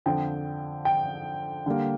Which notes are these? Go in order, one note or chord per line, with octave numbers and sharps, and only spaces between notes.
F2 D3 F3 G5
G5
D3 G3 A#3